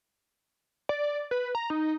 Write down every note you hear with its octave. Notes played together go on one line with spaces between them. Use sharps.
D5
B4
A#5
D#4